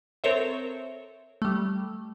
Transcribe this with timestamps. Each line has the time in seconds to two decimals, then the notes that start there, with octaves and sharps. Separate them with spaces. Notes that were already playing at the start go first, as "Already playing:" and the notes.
0.24 C4 A4 A#4 C5 C#5 E5
1.42 G3 A3